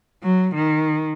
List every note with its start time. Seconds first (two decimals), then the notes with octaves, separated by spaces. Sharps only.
0.23 F#3
0.55 D#3